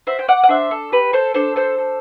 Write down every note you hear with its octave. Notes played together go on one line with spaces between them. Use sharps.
F#4 C5 E5
G5
D5 F#5
F#5
D4 C5 E5
A4
G4 B4
A4 C5
D4 A4 C5
A4 C5
A4